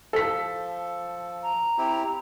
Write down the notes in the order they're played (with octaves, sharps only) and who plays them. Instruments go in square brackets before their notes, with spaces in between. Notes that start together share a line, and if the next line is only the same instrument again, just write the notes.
[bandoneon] F3 [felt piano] A4 B6
[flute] A#5
[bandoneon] C4 E4 G4